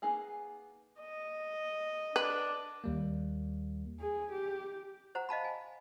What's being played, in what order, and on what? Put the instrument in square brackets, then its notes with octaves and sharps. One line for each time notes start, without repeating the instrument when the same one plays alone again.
[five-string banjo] A#3 B3 D#4 G#4 G#5
[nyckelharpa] D#5
[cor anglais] D4 [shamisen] B4
[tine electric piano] D#2 G3 A#3
[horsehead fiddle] G#4
G4
[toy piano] C5 F#5 A#5
D#5 F5 A5 B5
G#5